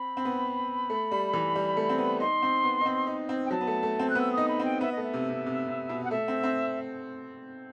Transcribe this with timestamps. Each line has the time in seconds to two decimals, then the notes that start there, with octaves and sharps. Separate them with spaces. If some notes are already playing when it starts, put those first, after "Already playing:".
Already playing: C4 B5
0.17 C4
0.25 B3
0.90 A3
1.11 G3
1.33 E3
1.55 G3
1.77 A3
1.89 C4
1.98 B3
2.20 D#4 C6
2.42 C4
2.64 B3
2.81 D#4
2.86 C4
3.07 D#4
3.29 C4
3.46 G5
3.51 F#3 A5
3.61 B3
3.67 A3
3.83 A3
3.99 C4
4.10 F#6
4.15 B3
4.21 E6
4.32 D#6
4.37 D#4
4.48 B5
4.59 C4
4.65 G5
4.81 B3 E5
4.92 D#5
4.97 A3
5.03 E5
5.14 C3
5.30 C3
5.46 C3
5.68 C3
5.89 B2
6.04 F#5
6.11 A3 E5
6.28 C4
6.43 C4